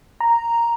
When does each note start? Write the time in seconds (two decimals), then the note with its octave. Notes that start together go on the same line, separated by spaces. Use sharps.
0.20 A#5